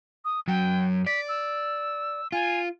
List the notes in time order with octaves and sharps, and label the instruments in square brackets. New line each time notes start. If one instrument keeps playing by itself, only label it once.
[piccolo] D#6
[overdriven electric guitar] F#2 F#3 [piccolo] G5
[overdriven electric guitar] D5 [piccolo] B6
[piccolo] E6
[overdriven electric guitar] F4 [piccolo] G#5